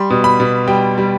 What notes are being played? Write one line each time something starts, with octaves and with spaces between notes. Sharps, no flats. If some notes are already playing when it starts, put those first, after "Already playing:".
Already playing: G3 C6
B2
B5
B2
G3 G5
G3